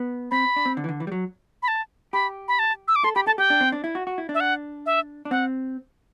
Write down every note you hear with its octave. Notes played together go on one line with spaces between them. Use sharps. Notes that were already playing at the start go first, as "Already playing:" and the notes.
Already playing: B3
C4 B5
D4
C4
D3
E3
D3
E3
G3
F#3
B5
A5
G4 B5
B5
A5
E6
D6
A4 C6
G4 B5
A4 A5
G4 G5
D4
C4
D4
E4
F#4
F#4
E4
D4
E5
F#5
E5
D4
C4 F#5